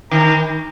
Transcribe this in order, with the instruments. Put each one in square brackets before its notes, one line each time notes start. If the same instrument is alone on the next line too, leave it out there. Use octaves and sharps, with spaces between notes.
[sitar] D#3 [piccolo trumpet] A#5